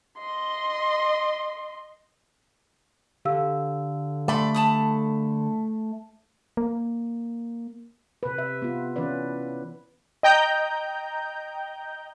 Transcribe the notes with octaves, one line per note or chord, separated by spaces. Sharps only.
D#5 C6
D3 G4 F5 E6
A3 D5 B5 C6
A5 B5 D#6
A#3
C3 B4
E5
B3 F4
E3 C#4 E4 B4 D5
D#5 G5 A#5 G6